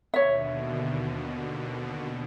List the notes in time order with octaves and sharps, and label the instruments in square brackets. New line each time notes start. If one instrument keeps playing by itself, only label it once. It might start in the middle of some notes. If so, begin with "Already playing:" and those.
[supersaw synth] D#2 B2 D3 [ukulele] C#5 E5